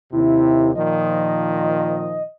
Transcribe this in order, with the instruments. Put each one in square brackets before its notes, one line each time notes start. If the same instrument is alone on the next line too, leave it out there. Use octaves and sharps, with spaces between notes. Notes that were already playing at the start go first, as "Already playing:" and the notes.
[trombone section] D#2 C3 [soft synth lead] E4
[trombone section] A#2 D#3 F3 [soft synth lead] D#5